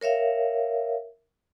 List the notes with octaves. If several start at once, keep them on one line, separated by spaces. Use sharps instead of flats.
A#4 C#5 E5 F5